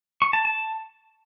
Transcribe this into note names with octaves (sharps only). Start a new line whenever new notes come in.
C#6
A5
A5